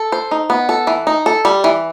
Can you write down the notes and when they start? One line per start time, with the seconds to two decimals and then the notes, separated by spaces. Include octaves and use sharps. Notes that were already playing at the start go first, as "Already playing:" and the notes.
Already playing: A4
0.12 C5
0.31 D#4
0.50 B3
0.69 A4
0.87 E3
1.07 D#4
1.26 A4
1.45 G3
1.64 E3